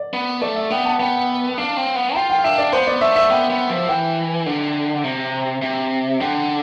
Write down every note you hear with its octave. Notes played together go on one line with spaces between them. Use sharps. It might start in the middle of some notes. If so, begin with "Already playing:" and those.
Already playing: D5
B3
A3 D5
E5
B3 G5
A5
B3 G5
D4 F5
C4
B3
F4 G5
G5
F5
D4 E5
D5
B3 C5
D5
A3 E5
E5
B3 G5
B3
F3
E3 G5
D3
C3
C3
D3 G5